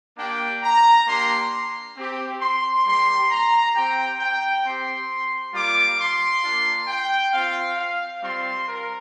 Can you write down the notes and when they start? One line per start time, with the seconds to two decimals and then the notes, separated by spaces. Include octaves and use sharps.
0.17 A#3 D4 G4 G5
0.62 A#5
1.06 A#3 D4 G4 C6
1.96 C4 G4
2.41 C6
2.85 G3 A#3 G4 C6
3.30 A#5
3.75 C4 G4 G5
4.19 G5
4.64 C4 G4 C6
5.54 G3 A#3 F4 D6
5.99 C6
6.43 A#3 D4 F4
6.88 G5
7.33 C4 F4 F5
7.77 F5
8.22 G3 C4 F4 C6
8.67 A#4